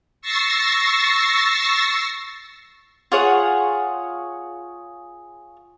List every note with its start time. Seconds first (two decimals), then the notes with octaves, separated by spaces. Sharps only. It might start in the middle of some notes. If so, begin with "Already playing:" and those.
0.22 C#6 E6 A6 A#6 C7
3.12 F4 G#4 C#5 F#5